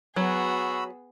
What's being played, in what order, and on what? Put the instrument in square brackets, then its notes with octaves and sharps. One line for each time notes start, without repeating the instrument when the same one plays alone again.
[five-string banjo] F#3 [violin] B3 G#4 [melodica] F#4 B5 E6